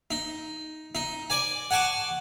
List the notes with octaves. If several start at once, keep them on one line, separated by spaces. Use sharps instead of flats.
D#4
D#4
D5 G#5
F#5 G#5 A5 C#6 D6